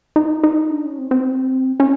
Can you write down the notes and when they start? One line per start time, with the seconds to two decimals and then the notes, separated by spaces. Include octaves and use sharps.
0.16 D#4
0.44 D#4
0.70 D4
0.85 C#4
0.98 C4
1.11 C4
1.80 C#4